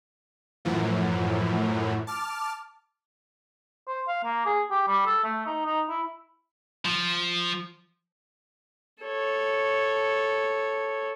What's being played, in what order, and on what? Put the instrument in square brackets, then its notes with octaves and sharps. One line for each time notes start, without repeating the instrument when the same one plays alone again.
[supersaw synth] F#2 A2 E3 F3
A5 D6 F6
[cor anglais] C5
F5
A#3
G#4
G4
G3
A4
A3
D#4
D#4
E4
[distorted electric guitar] F3
[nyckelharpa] A4 C#5